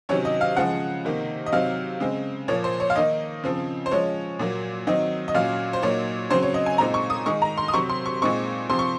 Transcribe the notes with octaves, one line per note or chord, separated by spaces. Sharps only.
C3 D#3 F#3 C#4 C#5
D#5
F5
C#3 F3 G#3 F#5
C3 D#3 A#3 D#4
D#5
C3 F#3 C4 D#4 F5
C#3 G#3 C4
A#2 F3 A#3 C#5
C5
C#5
F5
D#3 A#3 D#4 D#5
C#3 F3 C4
C5
F3 G#3 C#4 C#5
A#2 F#3 A#3
D#3 F#3 C4 D#4 D#5
D#5
A#2 F#3 C#4 F5
C5
A#2 F#3 A#3 D#4 C#5
C#3 F#3 C4 C5
C#5
D#5
G#5
A#2 G#3 C4 D#4 A#5
C#6
D#6
D#3 G#3 D#4 C#6
A#5
C6
D#6
C3 F#3 C4 C#6
C6
C#6
A#2 G#3 C4 D#4 C#6
C3 F3 C4 C6
C#6